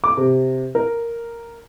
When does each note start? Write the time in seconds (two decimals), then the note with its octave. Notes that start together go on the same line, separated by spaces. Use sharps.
0.04 D6
0.17 C3
0.75 A#4